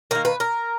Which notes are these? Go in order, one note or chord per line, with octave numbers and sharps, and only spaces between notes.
D#3 A#3 A#4
B4
A#4